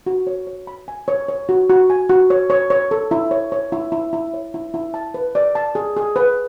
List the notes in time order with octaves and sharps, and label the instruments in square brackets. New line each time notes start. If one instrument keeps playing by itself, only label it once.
[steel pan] F#4
C#5
C#5
B5
G#5
C#5
C#5
F#4
F#4
G#5
F#4
C#5
C#5
C#5
A4
E4
C#5
C#5
E4
E4
E4
C#5
E4
E4
A5
B4
D5
A5
G#4
G#4
B4